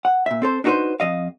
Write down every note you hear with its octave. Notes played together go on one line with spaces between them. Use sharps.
F#5
A#2 E5
C4 A4 C5
D4 D#4 F#4 G4 B4 C5
F2 D#5 F5